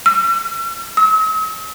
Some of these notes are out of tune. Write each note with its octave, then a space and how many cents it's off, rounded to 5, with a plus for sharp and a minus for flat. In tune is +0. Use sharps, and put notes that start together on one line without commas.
E6 +45
E6 -45